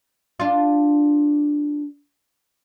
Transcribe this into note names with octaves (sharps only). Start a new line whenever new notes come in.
D4 F4